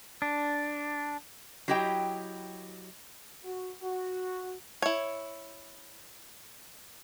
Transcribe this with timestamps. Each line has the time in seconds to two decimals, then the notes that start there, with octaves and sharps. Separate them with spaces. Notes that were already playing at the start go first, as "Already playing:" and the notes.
0.22 D4
1.68 F#3 E4 G4 D#5 G5
3.44 F#4
3.82 F#4
4.82 E4 C#5